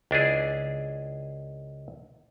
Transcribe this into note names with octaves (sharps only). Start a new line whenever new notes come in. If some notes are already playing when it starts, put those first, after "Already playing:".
C#2 D4 E4 G#4